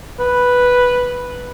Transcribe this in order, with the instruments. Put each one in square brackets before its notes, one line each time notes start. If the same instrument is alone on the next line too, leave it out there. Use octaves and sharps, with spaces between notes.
[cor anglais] B4